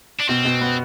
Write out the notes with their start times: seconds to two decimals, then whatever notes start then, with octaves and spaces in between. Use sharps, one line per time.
0.20 D4
0.29 B2 C4
0.45 B2
0.61 B3